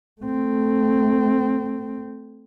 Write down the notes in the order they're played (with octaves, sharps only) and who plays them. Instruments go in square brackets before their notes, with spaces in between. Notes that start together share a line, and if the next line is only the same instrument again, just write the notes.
[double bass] A3 C4